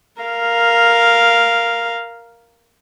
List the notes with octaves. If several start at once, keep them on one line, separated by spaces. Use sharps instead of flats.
A#4 F5